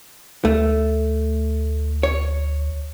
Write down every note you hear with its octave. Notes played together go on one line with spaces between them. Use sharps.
D2 A3
C#5